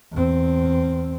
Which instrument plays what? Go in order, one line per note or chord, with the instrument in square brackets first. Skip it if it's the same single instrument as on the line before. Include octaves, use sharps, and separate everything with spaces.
[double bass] E2 C4